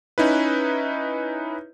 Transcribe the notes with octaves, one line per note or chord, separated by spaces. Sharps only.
C#4 D#4 E4 B4